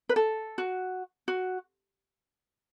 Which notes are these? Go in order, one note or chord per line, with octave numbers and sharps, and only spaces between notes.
B4
A4
F#4
F#4